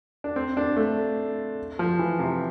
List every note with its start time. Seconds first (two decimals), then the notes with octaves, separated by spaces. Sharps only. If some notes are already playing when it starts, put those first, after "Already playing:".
0.24 D4
0.36 C4
0.57 D4
0.77 A3
1.79 F3
1.99 E3
2.19 C3